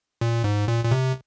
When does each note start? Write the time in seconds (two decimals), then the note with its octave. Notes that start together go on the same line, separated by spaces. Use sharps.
0.21 A#2
0.44 G#2
0.68 A#2
0.85 A#2
0.91 C3